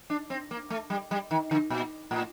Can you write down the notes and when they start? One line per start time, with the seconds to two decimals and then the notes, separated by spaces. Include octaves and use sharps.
0.10 D4
0.30 C4
0.51 A#3
0.70 A3
0.90 G3
1.11 G3
1.31 D#3
1.51 D3
1.70 A#2
2.11 A2